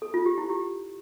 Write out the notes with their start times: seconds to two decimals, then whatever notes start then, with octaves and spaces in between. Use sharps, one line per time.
0.02 A4
0.14 F4
0.26 G4
0.38 E4
0.50 G4